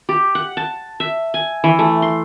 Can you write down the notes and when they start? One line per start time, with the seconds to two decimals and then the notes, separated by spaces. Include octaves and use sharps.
0.09 G4
0.35 F#5
0.57 A5
1.00 E5
1.34 G#5
1.64 E3
1.79 A3
2.02 C6